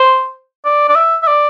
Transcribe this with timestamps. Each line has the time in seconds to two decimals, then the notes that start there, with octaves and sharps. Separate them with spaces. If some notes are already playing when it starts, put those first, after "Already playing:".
Already playing: C5
0.65 D5
0.89 D5
0.95 E5
1.22 E5
1.27 D5